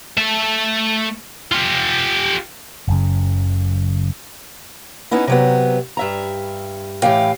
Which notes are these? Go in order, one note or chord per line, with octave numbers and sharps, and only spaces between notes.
A3 A5
F4 G4
F#1 F#2 C#3
B3 C#4 D#4 E4
C3 F#3 B3
G2 E5 A#5
A2 E3 G4 F5 G5